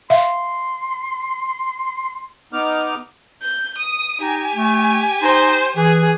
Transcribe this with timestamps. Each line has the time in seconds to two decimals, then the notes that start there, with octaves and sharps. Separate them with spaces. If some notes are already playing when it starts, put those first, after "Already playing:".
0.10 E5 F5 C6
2.53 B3 D#4 D6 F6
3.41 G6
3.78 D#6 D#7
4.21 D#4 G4 G#5
4.55 A3
5.22 D#4 C5
5.77 E3 G#4